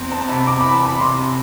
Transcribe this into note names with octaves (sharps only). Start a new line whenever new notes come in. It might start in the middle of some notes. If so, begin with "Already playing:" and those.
Already playing: E2 C4
C4 A5
A5
C3 B5
C3 D6
B5
E3
A5
E3 B5
C3 C6
C3